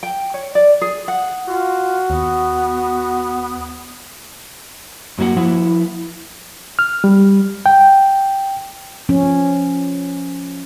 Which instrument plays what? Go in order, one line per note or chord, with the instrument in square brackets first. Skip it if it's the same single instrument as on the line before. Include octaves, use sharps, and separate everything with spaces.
[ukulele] G5
C#5
D5
G#4
F#5
[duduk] F4 [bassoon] F#4
[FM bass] D#2 [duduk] B3
[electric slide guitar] F#2 F#3 A#3 F4 F#5
F3 E4 F#5
[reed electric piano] F6
G3
G5
[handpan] F3 C#4